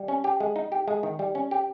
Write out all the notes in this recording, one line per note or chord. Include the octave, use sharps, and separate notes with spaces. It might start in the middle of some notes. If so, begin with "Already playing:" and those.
Already playing: G3
C#4
G4
G#3
D#4
G4
G#3
D#3
G3
C#4
G4